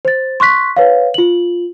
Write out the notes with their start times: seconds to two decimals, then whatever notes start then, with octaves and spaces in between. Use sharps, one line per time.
0.05 C5 A6
0.40 C6 C#6 F#6 B6
0.77 B4 C#5 F5
1.14 F4 F#7